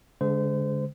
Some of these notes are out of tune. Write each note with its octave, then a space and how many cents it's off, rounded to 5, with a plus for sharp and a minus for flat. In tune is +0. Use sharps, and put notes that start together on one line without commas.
D3 -40 G#3 +0 C5 -30